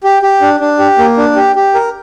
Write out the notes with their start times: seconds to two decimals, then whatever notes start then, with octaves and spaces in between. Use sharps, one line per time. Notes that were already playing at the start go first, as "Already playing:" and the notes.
0.04 G4
0.22 G4
0.42 D4
0.60 D4
0.79 G4
0.98 A#3
1.17 D4
1.36 G4
1.56 G4
1.75 A#4